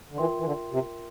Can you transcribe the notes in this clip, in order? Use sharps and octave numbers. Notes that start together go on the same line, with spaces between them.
D3
E3 F4 A#4 E5 G5 C6
E3
D3
C3